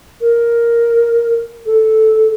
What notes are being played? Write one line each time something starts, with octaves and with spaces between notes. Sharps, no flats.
A#4
A4